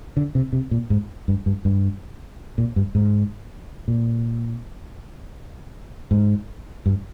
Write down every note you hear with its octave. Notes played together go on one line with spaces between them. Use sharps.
D3
C3
C3
A#2
G#2
G2
G2
G2
A#2
G2
G#2
A#2
G#2
G2